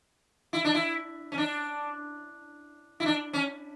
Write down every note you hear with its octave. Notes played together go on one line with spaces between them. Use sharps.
E4
D4
E4
C#4
D4
E4
D4
C#4